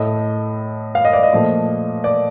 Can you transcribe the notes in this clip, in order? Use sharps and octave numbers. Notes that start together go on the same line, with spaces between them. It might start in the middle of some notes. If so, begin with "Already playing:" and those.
Already playing: A2 A3 D#5
F5
D#5
D5
D#5
A#2 F3 A3
D5